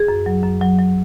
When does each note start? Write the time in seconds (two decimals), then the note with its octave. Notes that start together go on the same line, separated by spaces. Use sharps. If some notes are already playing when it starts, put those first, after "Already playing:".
Already playing: G#4
0.08 F#2
0.26 F#3
0.43 F#2
0.61 F#3
0.79 F#3